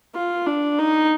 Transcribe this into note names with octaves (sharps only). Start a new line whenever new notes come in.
F4
D4
D#4